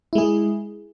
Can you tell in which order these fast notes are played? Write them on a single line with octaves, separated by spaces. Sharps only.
E4 G#3 G#4